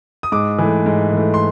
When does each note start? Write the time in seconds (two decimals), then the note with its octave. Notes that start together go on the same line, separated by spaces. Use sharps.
0.23 D#6
0.32 G#2 D6
0.58 E3 A3
0.86 G#2
1.12 E3 A3
1.34 C6